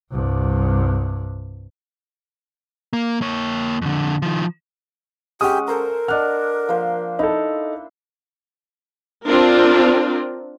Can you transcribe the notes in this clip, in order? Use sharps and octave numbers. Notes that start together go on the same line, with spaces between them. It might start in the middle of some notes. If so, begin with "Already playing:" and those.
C2 G2
A#3
A#3 C#5
F2 D3
D#3 F3
G#3 C#4 G4 F#5 D#6
A4 A#4 C5 A#5
D4 D#5 F#5 F6
F3 A#3 C5
D#4 E4 A4
C4 D4 F4 A#4